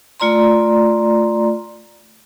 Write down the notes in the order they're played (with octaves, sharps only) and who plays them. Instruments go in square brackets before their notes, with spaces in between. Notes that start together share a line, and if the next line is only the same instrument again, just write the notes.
[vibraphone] A3 F4 D5 A#5 C6